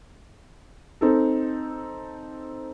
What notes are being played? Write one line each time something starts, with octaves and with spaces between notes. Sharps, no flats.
C4 D#4 A4